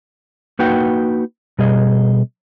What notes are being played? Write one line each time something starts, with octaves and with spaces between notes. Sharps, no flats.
A#3 D#4 F#4 B4 F#5 G5
B2 G3 G#4 D#5